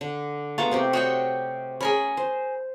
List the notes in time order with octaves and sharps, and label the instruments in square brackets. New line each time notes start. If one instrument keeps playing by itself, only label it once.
[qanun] D3
[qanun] G#3 A3 B3 [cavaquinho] F4 A#5 C#6
[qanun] C3 C4 G4
[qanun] F#4 [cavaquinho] C#5 D#5 G5
[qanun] C#4 [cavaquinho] G#4 A#4 B5
[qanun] C5